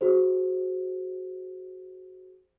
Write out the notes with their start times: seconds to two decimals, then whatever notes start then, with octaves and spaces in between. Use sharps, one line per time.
0.01 F#4 G#4 C5